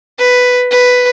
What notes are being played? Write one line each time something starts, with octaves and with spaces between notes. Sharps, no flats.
B4
B4